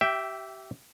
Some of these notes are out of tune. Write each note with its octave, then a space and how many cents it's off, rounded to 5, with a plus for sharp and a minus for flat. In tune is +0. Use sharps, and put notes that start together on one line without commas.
G4 -25 E5 +0 G5 +0